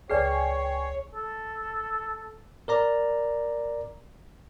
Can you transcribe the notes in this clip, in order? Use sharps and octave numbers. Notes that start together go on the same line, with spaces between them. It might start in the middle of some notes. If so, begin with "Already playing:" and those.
C#2 G#4 B4 C#5 D5 G5 G#5 C7
A4
A#4 D5 A#5